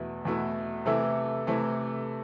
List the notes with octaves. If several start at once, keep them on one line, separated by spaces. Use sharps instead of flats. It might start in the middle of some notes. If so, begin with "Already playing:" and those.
Already playing: E2 B2 A3 E4 B4
E2 B2 A3 E4 B4
C3 E3 A3 E4 A4
C3 E3 A3 E4 A4